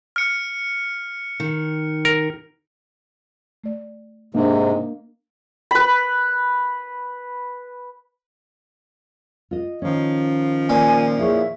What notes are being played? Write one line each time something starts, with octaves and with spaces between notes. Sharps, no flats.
F6 C#7
D#3
A#4
A3 D5
G#2 C3 A#3 D4 D#4
B4 B5
F4 D#5
D#3 F3 C#4
A#2 G#5
E4 G#4 C#5 E5